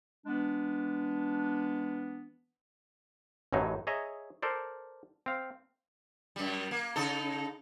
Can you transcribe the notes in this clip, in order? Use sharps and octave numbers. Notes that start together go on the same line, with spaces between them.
E3 G#3 B3 D4
A1 F#2 A2 F#3 D#4
G#4 C#5 D#5 E5 A#5
A4 A#4 C5 D5
C4 F5
F#2 G3
A#3
C#3 D#4 A4